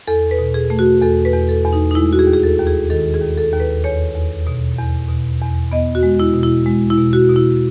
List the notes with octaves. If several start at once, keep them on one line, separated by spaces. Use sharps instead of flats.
E2 A4
B4
B2
G#4
A3
F#4
E2 A4
B4
E2
A4
E2
D#4
D#4
G#3 E4
F#4
G#4
D#2
G#4
A4
D#2
G#4
D#3 A4
G#4
D#2
A4
D#2
B4
E2 C#5
E2
B2
E2
B2
E2
B3 D#5
F#4
G#3
E4
B2
E4
G#3
E4
B2
F#4
B2
E4